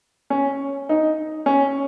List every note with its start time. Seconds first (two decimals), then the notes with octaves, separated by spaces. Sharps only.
0.30 C#4
0.89 D#4
1.46 C#4